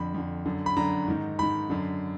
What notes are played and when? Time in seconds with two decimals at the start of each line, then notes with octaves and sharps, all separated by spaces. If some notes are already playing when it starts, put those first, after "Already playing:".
Already playing: F2 D3 B5
0.14 F2 D3
0.46 F#2 D3
0.66 B5
0.77 F#2 D3 A#5
1.08 G#2 D#3
1.39 G#2 D#3 B5
1.70 F#2 D3